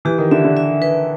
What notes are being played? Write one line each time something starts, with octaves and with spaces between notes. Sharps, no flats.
E3 G4
D#3
D3 E5
D3
E5
B4